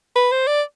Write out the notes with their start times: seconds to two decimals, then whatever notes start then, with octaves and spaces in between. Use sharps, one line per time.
0.16 B4
0.32 C5
0.47 D5